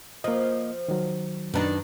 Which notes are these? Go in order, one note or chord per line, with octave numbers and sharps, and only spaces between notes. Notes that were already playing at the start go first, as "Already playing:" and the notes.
F3 A#3 D#5
D#3 F#3
F#2 D#3 D4 D#4 B4